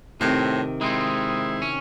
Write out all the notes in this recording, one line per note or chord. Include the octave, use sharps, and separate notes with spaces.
A2 C3 D#3 C4
G#3 C4 D#4 E4
C#4